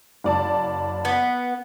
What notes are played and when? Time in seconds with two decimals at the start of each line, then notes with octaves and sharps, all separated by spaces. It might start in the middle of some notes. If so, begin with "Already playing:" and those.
0.24 F#1 D5 A5
1.05 B3